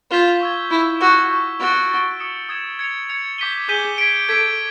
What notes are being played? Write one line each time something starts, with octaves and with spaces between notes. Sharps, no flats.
F4 G6 B6 E7 G7
C#6 E6 G#6
E4 C#6 E6 G#6
F#4 C#6 E6 G6
C#6 E6 G6
F#4 C#6 E6 A6 D7 G7
C#6 E6 A6 D7 G7
D#6 G#6 C#7 E7
D#6 G#6 C#7 E7
G#6 C#7 F7
G#6 C#7 F7
D6 G6 B6 D#7 G7
G#4 D6 G6 B6 D#7 G7
G#6 B6 D7
A4 G#6 B6 D7